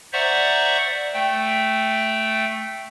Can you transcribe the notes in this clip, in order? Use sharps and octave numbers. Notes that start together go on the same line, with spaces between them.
C5 D5 E5 F#5 A#5 C#6
A3 G5